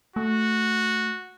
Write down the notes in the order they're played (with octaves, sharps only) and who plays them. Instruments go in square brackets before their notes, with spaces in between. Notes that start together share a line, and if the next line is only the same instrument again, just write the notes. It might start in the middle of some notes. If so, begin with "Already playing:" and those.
[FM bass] A3 [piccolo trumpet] F#4